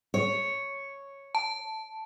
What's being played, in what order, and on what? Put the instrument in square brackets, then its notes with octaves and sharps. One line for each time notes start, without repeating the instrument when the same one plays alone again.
[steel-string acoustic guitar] C#5
[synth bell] A5